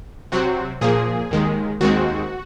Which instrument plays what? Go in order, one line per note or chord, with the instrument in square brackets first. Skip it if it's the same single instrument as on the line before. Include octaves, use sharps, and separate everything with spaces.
[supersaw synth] C3 F#3 C4 F#4
A#2 F3 A#3 G#4
D#2 D#3 G#3
D#2 D#3 G#3 C4 F#4